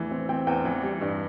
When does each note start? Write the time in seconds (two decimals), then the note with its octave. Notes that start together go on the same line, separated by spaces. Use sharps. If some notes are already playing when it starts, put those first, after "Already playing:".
Already playing: E2 A2 E3
0.11 C4
0.29 C4 G5
0.47 E2 G5
0.65 E3
0.83 G3
1.01 G2